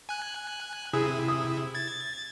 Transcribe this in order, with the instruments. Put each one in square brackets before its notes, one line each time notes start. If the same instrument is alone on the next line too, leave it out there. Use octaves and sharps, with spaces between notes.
[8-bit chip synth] G#5 F#6
[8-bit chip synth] C3 E4 [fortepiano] G#4
[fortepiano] D#6
[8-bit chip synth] G#6 A6